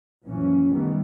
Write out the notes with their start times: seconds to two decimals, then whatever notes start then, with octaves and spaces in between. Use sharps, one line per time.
0.24 A#1 F#2 E3 F3 C#4
0.70 C2 D#3 E3 G3 A3 B3